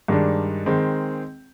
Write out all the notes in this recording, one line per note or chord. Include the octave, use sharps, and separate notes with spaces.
G2 D#3 G#3 D4
D#3 G#3 C4